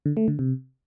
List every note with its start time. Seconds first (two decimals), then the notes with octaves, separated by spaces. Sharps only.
0.06 D3
0.17 A3
0.28 D3
0.39 C3